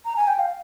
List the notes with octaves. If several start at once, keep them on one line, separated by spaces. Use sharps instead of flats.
A#5
G#5
G5
F5